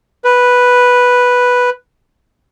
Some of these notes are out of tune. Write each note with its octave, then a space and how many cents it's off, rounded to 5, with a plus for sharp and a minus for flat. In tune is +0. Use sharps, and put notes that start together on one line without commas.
B4 -5